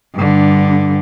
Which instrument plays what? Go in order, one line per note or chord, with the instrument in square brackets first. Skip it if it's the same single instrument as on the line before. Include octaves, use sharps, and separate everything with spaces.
[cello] G2 D3